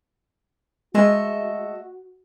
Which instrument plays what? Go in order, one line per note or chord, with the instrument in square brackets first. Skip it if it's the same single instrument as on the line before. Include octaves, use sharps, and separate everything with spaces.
[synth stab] G#3 [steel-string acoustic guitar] A3 D#5 E5 [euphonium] F#4